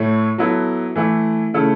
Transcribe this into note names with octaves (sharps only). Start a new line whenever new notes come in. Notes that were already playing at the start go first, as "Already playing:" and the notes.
Already playing: A2 A3 E4 C#5
F#3 B3 E4 A4
E3 A3 E4
C#3 A3 E4 A4